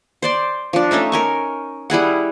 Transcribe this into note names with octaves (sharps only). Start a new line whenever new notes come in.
C5 D5 C6
F3 D4
A3 C#4 D#4 E5
A#4 G#5 C#6
G3 E4 G#4 F#5